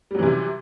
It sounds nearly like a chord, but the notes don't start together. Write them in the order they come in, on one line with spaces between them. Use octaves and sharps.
G3 F#3 E3 C3